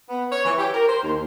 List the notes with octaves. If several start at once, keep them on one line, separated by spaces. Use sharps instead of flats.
B3
C#5
E3
G4
A#4
C5
D#2